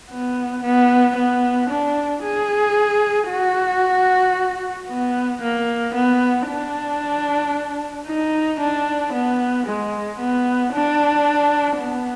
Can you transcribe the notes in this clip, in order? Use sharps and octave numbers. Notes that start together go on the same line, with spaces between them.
B3
B3
B3
D4
G#4
F#4
B3
A#3
B3
D4
D#4
D4
B3
G#3
B3
D4
B3